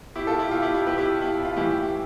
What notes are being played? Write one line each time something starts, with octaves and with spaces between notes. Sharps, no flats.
B2 E4 G4
F4 A4
E4 G4
B2 F4
E4 G4
E4 G4
B2 G4 B4
E4 G4
B2 E4
F4
A2 E3 E4 G4